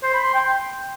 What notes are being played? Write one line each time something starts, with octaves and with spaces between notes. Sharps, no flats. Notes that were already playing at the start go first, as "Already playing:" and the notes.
C5
B5
C6
G5